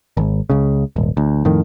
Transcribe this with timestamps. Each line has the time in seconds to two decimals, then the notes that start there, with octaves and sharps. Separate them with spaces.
0.17 G#1
0.50 C#2 C#3
0.96 D#1 G#1
1.17 D2
1.45 F2 A2 D#3